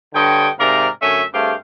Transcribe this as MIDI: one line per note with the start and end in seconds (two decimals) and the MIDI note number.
0.14 0.48 43
0.14 0.48 50
0.14 0.48 73
0.14 0.48 75
0.14 0.48 79
0.59 0.87 44
0.59 0.87 48
0.59 0.87 70
0.59 0.87 74
0.59 0.87 77
0.59 0.87 82
1.01 1.23 42
1.01 1.23 50
1.01 1.23 57
1.01 1.23 61
1.01 1.23 73
1.01 1.23 76
1.33 1.53 43
1.33 1.53 57
1.33 1.53 60
1.33 1.53 67
1.33 1.53 68
1.33 1.53 77